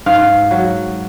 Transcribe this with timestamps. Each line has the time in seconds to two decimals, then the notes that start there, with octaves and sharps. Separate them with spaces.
0.06 G#2 F5
0.51 F#3